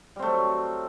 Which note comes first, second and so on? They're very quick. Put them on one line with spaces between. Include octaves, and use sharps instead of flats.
G3 C4 A3 F#3